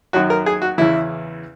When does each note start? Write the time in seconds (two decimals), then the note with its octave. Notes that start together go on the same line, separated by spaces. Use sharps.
0.13 F#2 D#3 F#3 F#4
0.30 A#4
0.46 G#4
0.62 F#4
0.78 E2 C#3 E3 E4